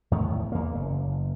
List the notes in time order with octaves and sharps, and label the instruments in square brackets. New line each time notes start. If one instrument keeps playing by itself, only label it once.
[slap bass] E2 A2 D#3
E2 A#3
F#1